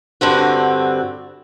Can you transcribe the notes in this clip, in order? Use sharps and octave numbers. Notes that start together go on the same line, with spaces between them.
G2 D3 C4 F#4